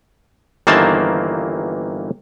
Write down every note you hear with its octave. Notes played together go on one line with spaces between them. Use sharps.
G1 D#3 E3 A#3 C5 A5